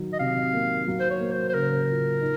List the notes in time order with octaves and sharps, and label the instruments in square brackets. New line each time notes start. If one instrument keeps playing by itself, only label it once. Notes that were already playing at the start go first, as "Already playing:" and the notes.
Already playing: [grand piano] D#3 F#3
[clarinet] D#5
[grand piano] C3 [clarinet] F5
[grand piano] A#3
F#3
[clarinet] C5
C#5
[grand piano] A#3
[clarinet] C5
C5
[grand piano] C#3 [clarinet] A#4
[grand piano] F4
D#4